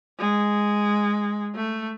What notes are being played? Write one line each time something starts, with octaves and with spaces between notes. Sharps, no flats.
G#3
A3